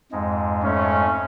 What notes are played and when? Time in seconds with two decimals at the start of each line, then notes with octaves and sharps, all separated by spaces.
0.12 F2 G#2 G#3
0.63 A3 C#4